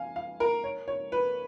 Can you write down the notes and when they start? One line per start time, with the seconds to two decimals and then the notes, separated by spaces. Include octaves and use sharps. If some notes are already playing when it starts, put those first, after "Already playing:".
Already playing: F5 G#5
0.16 F5
0.40 A#4
0.64 C#5
0.88 C#5
1.12 B4